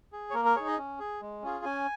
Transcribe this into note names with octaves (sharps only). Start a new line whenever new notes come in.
G#4
C#5
A#3 A#4
A#4
D#4 G#4 C#5
D#5
C#4
G#4
G#3
C#4 F4 G#4
C#4 G#5